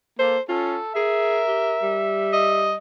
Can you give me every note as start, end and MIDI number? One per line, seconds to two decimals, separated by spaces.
0.19 0.37 58
0.19 0.39 69
0.19 0.40 72
0.49 0.78 61
0.49 0.80 65
0.49 0.93 69
0.95 1.41 68
0.95 1.98 70
0.95 2.63 76
1.48 1.75 67
1.82 2.76 55
2.33 2.76 75